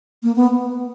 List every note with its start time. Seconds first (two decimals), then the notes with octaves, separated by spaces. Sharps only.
0.23 A#3
0.36 B3